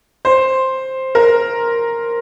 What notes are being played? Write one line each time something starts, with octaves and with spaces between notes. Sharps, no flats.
C5
A#4